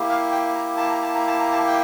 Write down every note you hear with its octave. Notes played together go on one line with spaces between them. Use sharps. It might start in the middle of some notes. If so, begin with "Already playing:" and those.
Already playing: A#3 E4 G4
F5
G5
A#5
A5
A#5
A5
A#5
A5
A#5
A5
G5